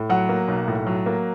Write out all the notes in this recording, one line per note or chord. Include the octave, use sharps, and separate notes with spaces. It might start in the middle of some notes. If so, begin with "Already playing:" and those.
Already playing: A2
F#3 F#5
A#3
B1
A2
F#3
A#3